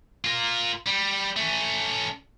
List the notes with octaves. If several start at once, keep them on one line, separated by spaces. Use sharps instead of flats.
F4 A#4
G3
A3 C#4